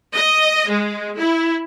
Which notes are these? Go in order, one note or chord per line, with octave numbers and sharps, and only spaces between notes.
D#5
G#3
E4